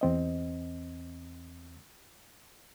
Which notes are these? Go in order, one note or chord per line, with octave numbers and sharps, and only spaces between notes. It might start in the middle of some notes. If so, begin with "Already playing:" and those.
E2 C4 D#5